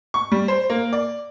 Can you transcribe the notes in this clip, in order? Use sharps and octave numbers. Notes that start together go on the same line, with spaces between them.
C#6
G3
C5
A#3
D5